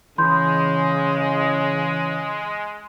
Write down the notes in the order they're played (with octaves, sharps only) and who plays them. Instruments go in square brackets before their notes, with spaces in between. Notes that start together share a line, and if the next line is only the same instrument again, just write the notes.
[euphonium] C#3 [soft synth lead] E3 [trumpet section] G#3 [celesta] B5 C6 G6